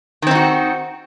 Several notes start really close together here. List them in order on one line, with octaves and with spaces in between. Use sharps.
D#3 C4 D#4 F#4